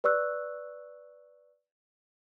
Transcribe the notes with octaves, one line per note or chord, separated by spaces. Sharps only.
B4 D5 C#6 E6 F#6